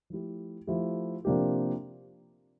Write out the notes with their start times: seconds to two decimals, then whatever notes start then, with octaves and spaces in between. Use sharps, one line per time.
0.10 F3 A3 E4 G4
0.67 F3 A3 E4 G4
1.25 C3 F3 A#3 D4 G4